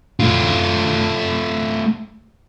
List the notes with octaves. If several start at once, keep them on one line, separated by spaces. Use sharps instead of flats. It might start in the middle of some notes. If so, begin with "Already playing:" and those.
A3 F4